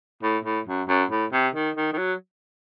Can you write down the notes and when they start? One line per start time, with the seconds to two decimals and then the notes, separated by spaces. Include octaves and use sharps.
0.23 A2
0.45 A2
0.67 F#2
0.88 F#2
1.11 A2
1.32 C3
1.55 D#3
1.77 D#3
1.93 D#3
1.98 F#3